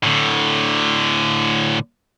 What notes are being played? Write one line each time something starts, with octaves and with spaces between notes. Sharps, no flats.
A2 D3